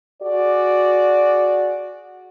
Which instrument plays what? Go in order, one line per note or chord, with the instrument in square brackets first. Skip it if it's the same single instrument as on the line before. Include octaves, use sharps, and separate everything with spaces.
[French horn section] F#4 G#4 D5